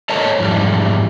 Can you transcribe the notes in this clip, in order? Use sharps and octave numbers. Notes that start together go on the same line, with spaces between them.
A4 A#4 C5 C#5 D#5 A5
F2 G#2 E3 G3